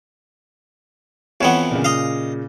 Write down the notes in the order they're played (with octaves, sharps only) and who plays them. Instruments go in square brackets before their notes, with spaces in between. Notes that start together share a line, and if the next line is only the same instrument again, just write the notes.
[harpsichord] F2 E3 B3 [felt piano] C#5 F#5
[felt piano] A#2 C#3
[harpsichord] D#5 F5